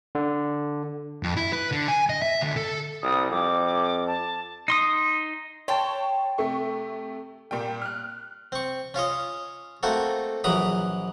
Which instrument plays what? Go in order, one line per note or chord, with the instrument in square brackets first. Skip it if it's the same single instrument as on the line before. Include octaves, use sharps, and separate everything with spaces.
[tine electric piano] D3
[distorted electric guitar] F2
E4
B4
D3
G#5
D#5
E5
D2
A4
[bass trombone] C2 [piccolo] D#6
[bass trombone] F2 [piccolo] D6
[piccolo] A5
[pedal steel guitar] D#4 C6 D#6
[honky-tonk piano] C#5 A5 C#6 [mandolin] G5 C6
[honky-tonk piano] C3 A3 C#6
A#2 G3 G5
F6 F#6
[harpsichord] C4 C#6
C#4 F4 C#5 D#5
A3 A#3 C4 F#4 A4
A#1 E3 F#3 A#5 B5 D#6